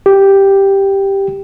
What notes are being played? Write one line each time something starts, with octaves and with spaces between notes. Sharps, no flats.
G4